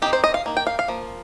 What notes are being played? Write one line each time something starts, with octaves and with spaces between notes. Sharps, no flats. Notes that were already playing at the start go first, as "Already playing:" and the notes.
D#3 C4 D#4 G4
C5
D#5
F5
D#3 A#3
G5
F5
F5
F3 A#3